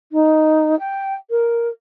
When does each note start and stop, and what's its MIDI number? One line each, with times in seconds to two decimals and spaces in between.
0.12 0.78 63
0.79 1.14 79
1.30 1.68 70